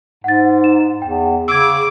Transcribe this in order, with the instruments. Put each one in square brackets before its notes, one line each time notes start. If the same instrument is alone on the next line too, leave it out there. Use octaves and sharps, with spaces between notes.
[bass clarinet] G#2 [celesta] F#5 A6
[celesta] D#4 E7
[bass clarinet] E2 [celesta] G5
[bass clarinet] C#3 [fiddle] D6 [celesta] E6 G#6